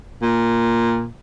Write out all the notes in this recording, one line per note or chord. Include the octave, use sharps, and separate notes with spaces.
A#2